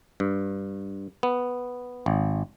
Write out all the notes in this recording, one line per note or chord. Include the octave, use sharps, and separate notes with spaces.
G2
B3
G#1